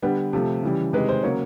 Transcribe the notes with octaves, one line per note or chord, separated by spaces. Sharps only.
D3 G3 B3 B4
C3 F3 A3
C#3 E3 G3
C3 D#3 G#3 B4
C5
C#3 F#3 A#3 C#5